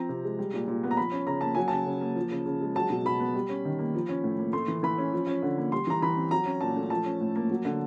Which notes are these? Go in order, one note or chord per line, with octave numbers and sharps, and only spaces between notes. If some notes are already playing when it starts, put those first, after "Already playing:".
Already playing: F3 C4 A#5
C3
G#3
G3
A#2
A#2
B3
A#5
F3 B5
C#4
C#3 A#5
A#3 A5
F#3 G#5
C#3 A5
C#3
A#3
F3
C#3
C#3
G#3
F#3 A5
B2
B2 B5
B3
G3
C#4
D#3
A#3
F3
C#4
A2
A#3
A3 C6
E3
E3 B5
C#4
F3
C#4
D3
A#3
G3 C6
E3 A#5
E3 B5
C4
F#3 A#5
C#4
A#2 A5
A3
F3 A5
C#4
A2
A#3
F#3
D3